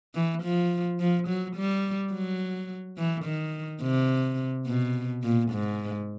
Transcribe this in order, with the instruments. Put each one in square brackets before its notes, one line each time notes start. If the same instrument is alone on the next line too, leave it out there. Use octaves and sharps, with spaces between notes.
[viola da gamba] E3
F3
F3
F#3
G3
F#3
E3
D#3
C3
B2
A#2
G#2